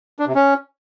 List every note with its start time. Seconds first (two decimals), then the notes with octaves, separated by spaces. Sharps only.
0.19 D4
0.27 C3
0.35 C#4